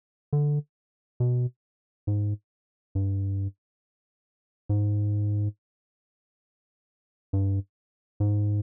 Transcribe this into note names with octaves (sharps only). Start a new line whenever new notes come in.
D3
B2
G#2
G2
G#2
G2
G#2